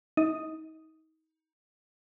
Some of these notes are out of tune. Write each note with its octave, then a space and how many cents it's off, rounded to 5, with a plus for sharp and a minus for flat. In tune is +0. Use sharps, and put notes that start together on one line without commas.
D#4 +35 D#6 +0